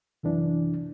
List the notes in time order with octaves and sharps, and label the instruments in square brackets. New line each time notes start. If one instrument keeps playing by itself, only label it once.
[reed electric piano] C2 F#2 E3 D4